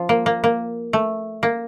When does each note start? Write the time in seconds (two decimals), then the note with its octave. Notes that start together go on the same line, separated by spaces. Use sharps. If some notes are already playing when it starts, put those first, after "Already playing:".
Already playing: F3 F4
0.09 A#3
0.26 A#3
0.44 A#3
0.93 A3
1.43 A#3